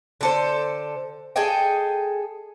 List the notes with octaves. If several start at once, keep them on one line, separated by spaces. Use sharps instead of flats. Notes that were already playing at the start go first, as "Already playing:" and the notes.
D3 A4 C5
G#4 A4 D#5 G5